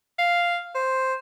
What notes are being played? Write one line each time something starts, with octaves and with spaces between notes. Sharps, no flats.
F5
C5